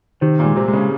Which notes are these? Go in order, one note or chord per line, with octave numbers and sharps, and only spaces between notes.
C3 D#3 C4
A#2 A#3
G#3
C3 C4
G#3
C#3 C#4